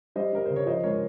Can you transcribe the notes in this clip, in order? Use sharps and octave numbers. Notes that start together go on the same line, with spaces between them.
G3 C5 D#5
G3 A#4
C#3 C5
C#5
F3 C5 D#5
G#3 A#4 C#5